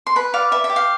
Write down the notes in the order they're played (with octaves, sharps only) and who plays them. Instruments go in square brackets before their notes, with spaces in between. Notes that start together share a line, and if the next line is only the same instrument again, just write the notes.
[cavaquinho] C6
B4 B5
D5 F5
B4 E5
E5
G4
F5